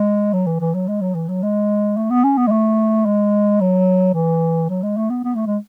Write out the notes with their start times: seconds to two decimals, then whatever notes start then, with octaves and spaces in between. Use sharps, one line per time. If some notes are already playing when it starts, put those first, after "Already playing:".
Already playing: G#3
0.33 F#3
0.46 E3
0.60 E3
0.74 F#3
0.88 G#3
1.01 F#3
1.15 E3
1.29 F#3
1.43 G#3
1.97 A3
2.10 B3
2.24 C#4
2.37 B3
2.47 G#3
2.51 A3
3.06 G#3
3.60 F#3
4.14 E3
4.70 F#3
4.83 G#3
4.97 A3
5.10 B3
5.24 B3
5.35 A3
5.47 G#3